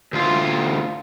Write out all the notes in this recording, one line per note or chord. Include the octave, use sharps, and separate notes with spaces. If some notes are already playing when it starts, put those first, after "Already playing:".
D2 F4